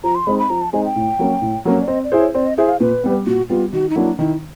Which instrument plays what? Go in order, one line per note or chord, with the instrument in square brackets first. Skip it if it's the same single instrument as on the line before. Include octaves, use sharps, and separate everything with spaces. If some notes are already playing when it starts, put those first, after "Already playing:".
[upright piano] F3 [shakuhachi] A#5
[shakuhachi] C6
[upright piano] G#3 C4 D#4 [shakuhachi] B5
[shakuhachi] B5
[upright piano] F3 [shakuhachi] A#5
[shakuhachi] A5
[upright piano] G#3 C4 D#4 [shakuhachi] G#5
[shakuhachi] G5
[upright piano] A2
F#3 A#3 C#4
A2
F#3 A#3 C#4
[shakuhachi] D5
[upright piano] C4 [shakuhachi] D#5
[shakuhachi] D5
[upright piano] E4 G#4 C5
[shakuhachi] C#5
[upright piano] C4 [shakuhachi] D5
[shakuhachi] D#5
[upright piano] E4 G#4 C5 [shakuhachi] E5
[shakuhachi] F5
[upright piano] A#2 [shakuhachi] B4
[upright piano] G3 B3
[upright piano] A#2 [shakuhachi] F#4
[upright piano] G3 B3 [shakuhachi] F4
[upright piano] D#3 [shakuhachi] F#4
[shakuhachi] D#4
[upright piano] F#3 A#3 D4 [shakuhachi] E4
[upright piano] D#3 [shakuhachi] E4